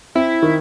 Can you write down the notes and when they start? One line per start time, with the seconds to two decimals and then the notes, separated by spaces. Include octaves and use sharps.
0.15 C4 E4
0.42 D#3